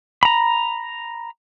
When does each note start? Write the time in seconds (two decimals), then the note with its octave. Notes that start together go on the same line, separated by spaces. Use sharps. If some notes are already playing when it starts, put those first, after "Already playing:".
0.23 A#5 B5